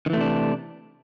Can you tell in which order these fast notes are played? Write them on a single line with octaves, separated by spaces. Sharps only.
D#3 E3 A3 C3 D4